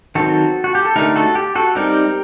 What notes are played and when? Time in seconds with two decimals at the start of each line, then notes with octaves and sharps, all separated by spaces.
0.15 D#3 F#3 C4 F#4 A4
0.64 F#4
0.75 G4
0.85 A4
0.96 D3 A3 D#4 G4 A#4
1.16 F#4 A4
1.35 G4
1.55 F#4 A4
1.75 G3 C4 D#4 G4 A#4